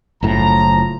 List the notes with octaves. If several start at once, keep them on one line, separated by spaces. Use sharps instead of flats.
F#1 A2 F3 A#5